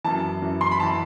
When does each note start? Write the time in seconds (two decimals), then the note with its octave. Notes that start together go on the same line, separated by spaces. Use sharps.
0.04 F#2 E3 A5
0.42 F#2 E3
0.61 C6
0.71 B5
0.80 E3 A5